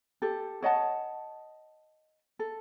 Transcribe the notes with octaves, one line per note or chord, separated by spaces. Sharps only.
G4 A4
C#5 D#5 F#5 A5
A4